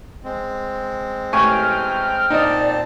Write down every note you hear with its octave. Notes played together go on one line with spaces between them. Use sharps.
G#3 C4
A1 G5 G#5 C#6 F6
A#2 C4 D#4 D5 D#5 A5